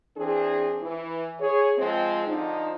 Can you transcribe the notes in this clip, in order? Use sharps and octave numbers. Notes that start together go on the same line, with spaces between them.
E3 C4 D4 G#4
E3
G#4 C#5
F3 G#3 C4
D3 F3 D#4